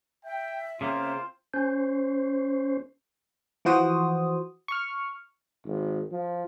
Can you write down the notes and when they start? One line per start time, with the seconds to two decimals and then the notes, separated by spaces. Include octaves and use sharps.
0.25 E5 G5
0.81 C#3 A#3 C4 F4 C5
1.54 C#4 C5
3.65 E3 F3 F#4 C5 D#6
4.68 C#6 F6
5.65 G#1
6.11 F3